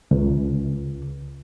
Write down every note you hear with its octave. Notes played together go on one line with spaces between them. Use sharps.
C#2